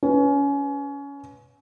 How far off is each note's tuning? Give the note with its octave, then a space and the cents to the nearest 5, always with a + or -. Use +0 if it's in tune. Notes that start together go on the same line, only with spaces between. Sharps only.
C#4 +25 B4 +0